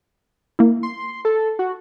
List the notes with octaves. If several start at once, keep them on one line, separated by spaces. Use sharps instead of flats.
A#3 E4
C6
A4
F#4